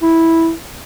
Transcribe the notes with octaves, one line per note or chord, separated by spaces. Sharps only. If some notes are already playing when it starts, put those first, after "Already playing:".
E4